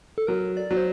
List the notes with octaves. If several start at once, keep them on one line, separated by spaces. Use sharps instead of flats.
A4
F#3 A#4
D5
F#3
C5